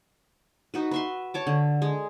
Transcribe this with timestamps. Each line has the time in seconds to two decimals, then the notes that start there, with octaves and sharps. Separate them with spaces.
0.74 D#4 F#4 B4
0.91 B4 E5 C6
1.34 C#5 A5 D6
1.47 D3
1.82 G#3 G#4